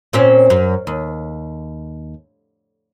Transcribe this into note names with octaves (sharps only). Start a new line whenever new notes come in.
A#2 C4 C#4
F#2
D#2